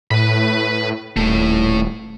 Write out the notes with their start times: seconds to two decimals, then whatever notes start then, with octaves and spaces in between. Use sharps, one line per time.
0.11 A2 B4 B5
1.16 D#1 A2 A3